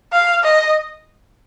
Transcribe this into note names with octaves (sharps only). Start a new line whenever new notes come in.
F5
D#5